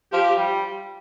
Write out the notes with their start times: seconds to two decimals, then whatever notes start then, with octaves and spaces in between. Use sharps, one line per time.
0.13 F3 G4
0.37 G3